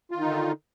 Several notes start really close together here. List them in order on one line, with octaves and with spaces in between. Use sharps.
F4 D#3 D#4 D3